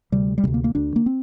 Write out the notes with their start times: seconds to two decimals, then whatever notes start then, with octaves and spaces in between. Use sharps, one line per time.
0.12 D2 C3 G3
0.38 G3
0.44 C3 G#3
0.47 D2
0.54 A#3
0.64 A#3
0.75 D2 D3 D4
0.96 A#3
1.06 C4